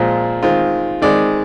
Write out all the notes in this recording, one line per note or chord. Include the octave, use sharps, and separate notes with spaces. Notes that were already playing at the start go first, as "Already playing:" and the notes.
Already playing: A#2 F3 G#3 C4 F4
D#3 G#3 C4 F4
D#3 G#3 C4 D5